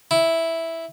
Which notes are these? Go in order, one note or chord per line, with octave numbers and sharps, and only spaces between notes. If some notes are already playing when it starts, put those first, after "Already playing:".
E4